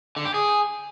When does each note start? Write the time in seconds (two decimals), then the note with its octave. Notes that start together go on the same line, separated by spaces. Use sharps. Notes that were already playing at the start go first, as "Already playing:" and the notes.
0.17 D3
0.25 G4
0.34 G#4